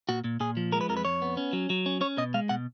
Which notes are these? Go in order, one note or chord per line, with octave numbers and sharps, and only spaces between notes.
A#2 F#4
A#2
A#2 G#4
F3
G#3 A#4
B4
F2 A#4
B4
F2 C#5
B3
C#4
F#3
F#3
C#4
C#4 C#5
B2 D#5
G#3 F5
B2 F#5